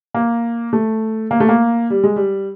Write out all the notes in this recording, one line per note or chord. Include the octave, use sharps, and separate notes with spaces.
A#3
A3
A#3
A3
A#3
G3
G#3
G3